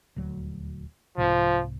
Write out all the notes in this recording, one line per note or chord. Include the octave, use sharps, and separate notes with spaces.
D#1 D2 F#3
C2 G#2 C3 F3